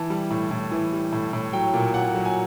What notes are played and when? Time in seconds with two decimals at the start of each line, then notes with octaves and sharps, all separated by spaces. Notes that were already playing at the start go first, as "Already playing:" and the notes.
Already playing: E3 A5
0.10 G3
0.30 A2
0.51 A2
0.71 E3
0.93 G3
1.12 A2
1.33 A2
1.53 F#3 G5
1.74 A#2
1.94 A#2 F#5
2.15 F#3
2.25 G#5